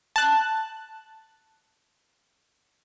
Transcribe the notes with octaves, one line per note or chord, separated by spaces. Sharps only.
A5 F#6